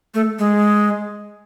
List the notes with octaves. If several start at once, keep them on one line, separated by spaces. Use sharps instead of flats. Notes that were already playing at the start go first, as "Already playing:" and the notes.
A3
G#3